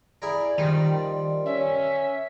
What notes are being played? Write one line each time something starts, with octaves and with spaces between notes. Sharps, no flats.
E4 G#4 A#4 D5
D#3 F3 G3
C#4 E5